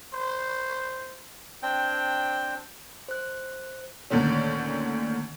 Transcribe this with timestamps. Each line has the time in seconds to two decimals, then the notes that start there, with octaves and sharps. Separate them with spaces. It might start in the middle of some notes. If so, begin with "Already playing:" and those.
0.14 C5
1.63 C4 D4 G5
3.08 C5 F#6
4.10 D2 A#2 D3 D#3 C#4